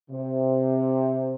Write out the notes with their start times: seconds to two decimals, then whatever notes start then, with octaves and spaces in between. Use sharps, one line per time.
0.10 C3